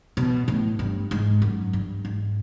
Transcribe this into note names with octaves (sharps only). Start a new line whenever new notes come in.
B2
A2
G2
G#2
F#2
G2
G#2